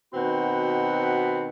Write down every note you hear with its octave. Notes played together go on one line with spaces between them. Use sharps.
B2 D#3 C4 F#4 F#5 B5